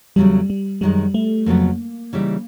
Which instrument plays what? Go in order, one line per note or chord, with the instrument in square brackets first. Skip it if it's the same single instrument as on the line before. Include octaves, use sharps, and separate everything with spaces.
[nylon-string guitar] E2 C#3 F#3 A3 [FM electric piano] G3
[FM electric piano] G3
[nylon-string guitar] F#2 D#3 G#3 [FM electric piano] G3
[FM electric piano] A3
[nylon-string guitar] F2 C#3 F#3 B3 [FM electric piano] A#3
[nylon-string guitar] C#3 E3 G3 B3 D#4